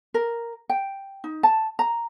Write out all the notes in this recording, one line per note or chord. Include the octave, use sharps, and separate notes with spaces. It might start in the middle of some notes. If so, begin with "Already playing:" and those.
A#4
G5
D#4
A5
A#5